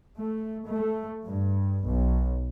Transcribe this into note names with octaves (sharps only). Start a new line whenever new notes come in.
A3
A3
G2
B1